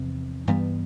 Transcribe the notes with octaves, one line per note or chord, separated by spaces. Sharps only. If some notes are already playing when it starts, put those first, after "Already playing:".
Already playing: E2 C3 F3
G2 E3 G3 B3